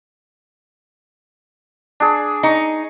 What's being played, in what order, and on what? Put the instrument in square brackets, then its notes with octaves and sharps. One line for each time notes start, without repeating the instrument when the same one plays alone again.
[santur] D4 G#4
[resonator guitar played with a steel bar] D#4 [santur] C#6